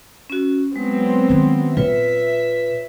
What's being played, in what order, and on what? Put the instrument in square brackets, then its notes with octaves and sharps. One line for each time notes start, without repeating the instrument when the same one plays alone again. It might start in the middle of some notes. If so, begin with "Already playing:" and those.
[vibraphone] C#4 F#4
[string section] F#3 B3 C4 [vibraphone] G#3
[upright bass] D#3 C#4
[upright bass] A#2 [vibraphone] F4 B4 C#5 [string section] E5